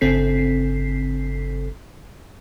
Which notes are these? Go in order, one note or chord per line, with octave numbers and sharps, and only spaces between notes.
G1 C#3 C4 A4 B6 C7